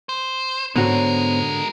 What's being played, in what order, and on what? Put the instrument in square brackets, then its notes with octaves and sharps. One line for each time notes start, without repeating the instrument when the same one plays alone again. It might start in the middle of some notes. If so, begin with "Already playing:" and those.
[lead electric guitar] C5
[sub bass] G#2 [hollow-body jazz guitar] D3 F#4 [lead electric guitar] G#3 A#4 [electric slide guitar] B3 C5 C#5